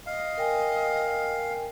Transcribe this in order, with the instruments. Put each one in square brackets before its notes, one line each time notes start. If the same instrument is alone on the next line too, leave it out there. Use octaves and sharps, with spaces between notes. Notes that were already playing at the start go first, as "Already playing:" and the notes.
[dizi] D#5 [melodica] F5
[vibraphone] A#4 G5 G#5